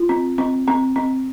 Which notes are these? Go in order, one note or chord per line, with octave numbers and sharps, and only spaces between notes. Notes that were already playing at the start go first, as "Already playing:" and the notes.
Already playing: F4
C4
C4
C4
C4